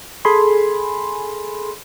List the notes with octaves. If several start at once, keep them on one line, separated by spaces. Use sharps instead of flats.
G#4 A4 G#5 B5 C6